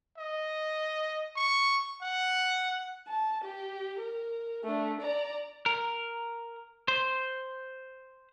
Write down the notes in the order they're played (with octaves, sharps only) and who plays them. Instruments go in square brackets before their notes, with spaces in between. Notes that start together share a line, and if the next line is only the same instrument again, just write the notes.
[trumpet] D#5
C#6
F#5
[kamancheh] A5
G4
A#4
A3 D4
D5 A#5
[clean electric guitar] A#4
C5